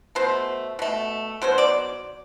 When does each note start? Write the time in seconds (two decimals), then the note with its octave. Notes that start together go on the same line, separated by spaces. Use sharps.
0.15 B2 A3 C5
0.79 B2 A3
1.42 B2 F#3 C5
1.58 D5